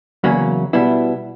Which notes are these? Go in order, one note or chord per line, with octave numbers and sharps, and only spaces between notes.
E2 C#3 F#3 A#3 C#4
B2 G3 B3 E4